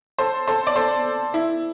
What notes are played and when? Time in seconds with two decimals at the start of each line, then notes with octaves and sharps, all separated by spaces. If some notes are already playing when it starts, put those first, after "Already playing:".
0.18 A4 C5
0.47 A4 C5
0.67 D5
0.76 A4 C5
1.34 E4